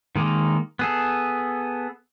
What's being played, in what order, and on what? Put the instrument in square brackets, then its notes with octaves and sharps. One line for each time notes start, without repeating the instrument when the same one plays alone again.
[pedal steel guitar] D#3 G#3 A#3
B3 G#4 A4